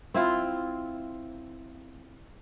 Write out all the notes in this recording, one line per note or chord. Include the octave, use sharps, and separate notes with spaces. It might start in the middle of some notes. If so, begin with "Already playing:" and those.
C4 E4 F4